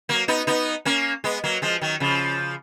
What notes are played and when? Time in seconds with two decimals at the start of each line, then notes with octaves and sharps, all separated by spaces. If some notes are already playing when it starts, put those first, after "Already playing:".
0.09 F#3 A#3
0.28 B3 D#4
0.47 B3 D#4
0.85 A#3 C#4
1.24 G#3 B3
1.44 F#3 A#3
1.62 F3 G#3
1.81 D#3 F#3
2.00 C#3 F3